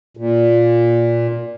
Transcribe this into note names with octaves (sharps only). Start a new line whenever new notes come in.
A#2